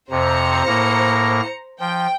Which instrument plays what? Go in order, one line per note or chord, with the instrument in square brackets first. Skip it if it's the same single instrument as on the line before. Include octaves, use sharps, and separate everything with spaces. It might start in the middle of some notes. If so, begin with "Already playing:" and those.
[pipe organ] F2 C3 [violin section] C5 A#5 C#7
[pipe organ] A2 A#3 A#6
[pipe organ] F3 [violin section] G5